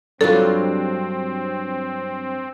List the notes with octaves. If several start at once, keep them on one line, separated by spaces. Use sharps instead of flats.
G2 F#3 G3 C4 D4 F4 A4